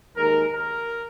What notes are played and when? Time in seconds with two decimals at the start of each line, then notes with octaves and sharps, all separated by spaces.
0.17 D#2 D#3 G#3 A#4
0.54 A#4